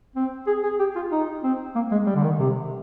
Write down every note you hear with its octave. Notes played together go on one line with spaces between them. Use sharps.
C4
G#4
G#4
G4
F4
D#4
C4
A#3
G#3
G3
D3
D#3
C3